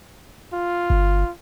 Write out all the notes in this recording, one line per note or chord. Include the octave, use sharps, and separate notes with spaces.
F4
G1